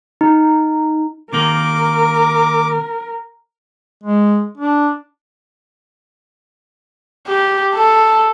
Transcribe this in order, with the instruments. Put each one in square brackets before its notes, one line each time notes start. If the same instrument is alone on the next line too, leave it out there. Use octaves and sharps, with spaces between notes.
[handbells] D#4
[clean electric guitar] C3 D#3 A#3 [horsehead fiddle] A#4 [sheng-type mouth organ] D6
[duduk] G#3
D4
[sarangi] G4
A4